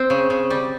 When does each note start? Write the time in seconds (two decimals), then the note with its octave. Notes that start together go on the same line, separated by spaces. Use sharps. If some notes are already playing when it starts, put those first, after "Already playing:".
Already playing: C4
0.10 C#3
0.30 C#3
0.50 G3